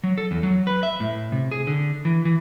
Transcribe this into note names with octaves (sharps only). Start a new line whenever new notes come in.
F#3
A4
E2
F#3
B4
E5
A2
C3
G#4
D3
E3
E3